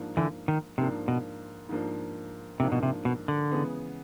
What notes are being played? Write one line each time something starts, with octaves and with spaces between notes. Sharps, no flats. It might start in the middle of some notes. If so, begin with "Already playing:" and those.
Already playing: G#2 F3 A#3 D4
D3 E3
D#3
G#2 C3 F3 A#3 D4
B2
G#2 F3 A#3 D4
G#2 C3 F3 A#3 D4
B2
C3
B2
D3
C#3 E3 G#3 B3